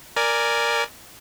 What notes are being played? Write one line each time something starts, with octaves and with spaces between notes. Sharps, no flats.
A#4 D5 G#5